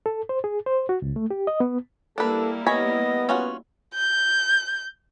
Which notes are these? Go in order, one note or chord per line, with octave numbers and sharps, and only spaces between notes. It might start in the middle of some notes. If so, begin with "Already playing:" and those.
A4
C5
G#4
C5
F#4
C#2
A3
G4
D#5
B3
G3 A#3 D4 E4 A4 B4
B3 C#5 D#5 G#5 B5
C#4 F4 F#4
G6